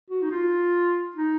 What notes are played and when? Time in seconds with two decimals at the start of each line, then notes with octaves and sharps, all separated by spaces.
0.10 F#4
0.22 D#4
0.31 F4
1.16 D#4